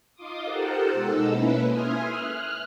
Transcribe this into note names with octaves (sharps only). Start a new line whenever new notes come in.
D#4 F4 C6 D6 D#6
G4 A4 A#4 C5 F#5 A5
B2 G#3 D#4 A4 E6
A#3 C#4 E4 B4
E5 G#5 C6 D#6 F6
F6 F#6